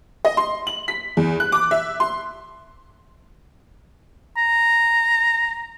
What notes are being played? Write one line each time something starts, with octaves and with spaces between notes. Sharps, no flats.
D#5
C6
F#7
B6
E2
F#6
D6
E5
C6
A#5